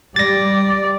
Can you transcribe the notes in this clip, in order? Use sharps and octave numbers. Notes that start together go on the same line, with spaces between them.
G3 D5 A6 A#6